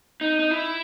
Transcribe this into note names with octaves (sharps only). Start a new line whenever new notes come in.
D#4
D#4
E4